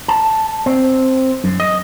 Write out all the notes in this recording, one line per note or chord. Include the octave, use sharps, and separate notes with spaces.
A5
C4
F#2
D#5